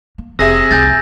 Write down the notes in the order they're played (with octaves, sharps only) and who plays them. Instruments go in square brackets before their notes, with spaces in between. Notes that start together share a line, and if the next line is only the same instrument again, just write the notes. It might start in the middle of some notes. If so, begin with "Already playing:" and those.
[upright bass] A#3
[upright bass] F1 [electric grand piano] C3 G#4 E5 [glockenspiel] E6 A#6
[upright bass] C2 [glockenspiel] G#5 G6 A6